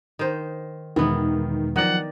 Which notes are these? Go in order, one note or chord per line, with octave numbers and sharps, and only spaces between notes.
D#3 C5
E2 B2 D#3 E3 G#3 B3
D#3 F3 F#3 D5 F#5